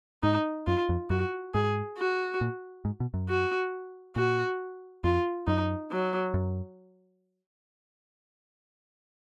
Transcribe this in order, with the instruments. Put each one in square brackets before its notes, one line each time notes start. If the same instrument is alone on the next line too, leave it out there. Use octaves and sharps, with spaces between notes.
[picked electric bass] G#2 [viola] D#4
[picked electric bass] F#2 [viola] F4
[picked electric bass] F2
[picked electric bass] F#2 [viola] F#4
[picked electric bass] G#2 [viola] G#4
[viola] F#4
[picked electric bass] A#2
G#2
B2
F#2
[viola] F#4
[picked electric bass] A#2 [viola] F#4
[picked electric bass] F2 [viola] F4
[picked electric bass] F#2 [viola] D#4
[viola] F#3
[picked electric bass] F#2